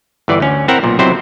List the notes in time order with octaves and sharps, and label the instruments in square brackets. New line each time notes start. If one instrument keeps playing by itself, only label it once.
[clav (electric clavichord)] G1 E3 D5
D2 C#4
C4 E4 A#4 E5 F#5 A#5
B1 A#2
B1 C3 F#3 C4 E4 C5